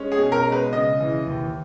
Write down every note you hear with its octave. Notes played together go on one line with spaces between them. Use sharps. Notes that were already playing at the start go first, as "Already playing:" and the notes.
Already playing: G#3 C#4
G#4
B2
A#4
G#3
B4
C#3 D#5
E3
D#2